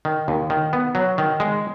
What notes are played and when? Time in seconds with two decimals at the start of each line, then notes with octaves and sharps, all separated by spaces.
0.05 D#3
0.28 D#2
0.50 D#3
0.73 B3
0.95 F#3
1.18 D#3
1.40 G#3